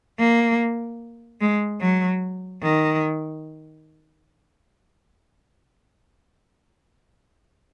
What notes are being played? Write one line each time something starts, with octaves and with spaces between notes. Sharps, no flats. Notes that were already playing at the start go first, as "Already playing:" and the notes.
A#3
G#3
F#3
D#3